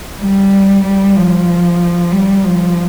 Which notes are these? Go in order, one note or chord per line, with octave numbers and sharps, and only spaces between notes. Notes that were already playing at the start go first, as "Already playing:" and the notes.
G3
G3
F3
G3
F3